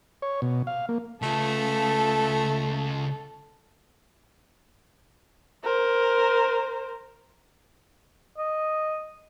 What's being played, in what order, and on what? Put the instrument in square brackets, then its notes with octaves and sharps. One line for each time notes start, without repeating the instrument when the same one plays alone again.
[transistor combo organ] C#5
B2
F5
A#3
[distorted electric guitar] C#3 F4 [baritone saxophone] A3 [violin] A4
[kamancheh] A#4 C5
[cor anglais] D#5